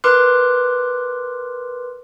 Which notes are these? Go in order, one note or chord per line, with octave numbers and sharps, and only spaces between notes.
A#4 B4 C6 D6 F6 F#6